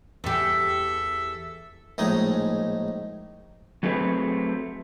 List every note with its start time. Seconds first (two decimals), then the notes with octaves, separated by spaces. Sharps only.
0.24 E2 G4 A4 E5
1.98 A#1 A2 G#3 D#4 G#5
3.83 F#3 A3 C4 G#4 B4